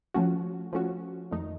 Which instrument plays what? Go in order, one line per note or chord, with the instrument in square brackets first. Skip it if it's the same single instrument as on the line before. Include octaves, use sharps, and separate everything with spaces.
[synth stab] F3 A3 C#4 F#4
F3 A3 C#4 F#4
F2 D#3 A3 D#4